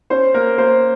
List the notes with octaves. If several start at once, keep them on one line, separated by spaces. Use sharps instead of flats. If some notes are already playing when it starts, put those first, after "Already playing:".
C#4 C5
A#3 A#4
A#3 C5